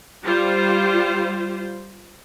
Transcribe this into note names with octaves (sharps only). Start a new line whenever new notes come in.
G3 F4 C5